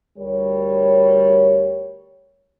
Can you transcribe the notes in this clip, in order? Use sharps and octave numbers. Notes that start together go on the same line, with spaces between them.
D2 G3 A#4 C#5